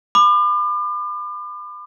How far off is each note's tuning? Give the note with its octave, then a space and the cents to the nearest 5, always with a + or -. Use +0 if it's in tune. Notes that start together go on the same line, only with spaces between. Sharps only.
B5 +30 D6 +40